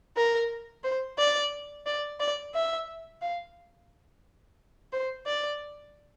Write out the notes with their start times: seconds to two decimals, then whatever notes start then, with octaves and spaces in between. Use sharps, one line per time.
0.17 A#4
0.84 C5
1.18 D5
1.86 D5
2.20 D5
2.55 E5
3.22 F5
4.93 C5
5.27 D5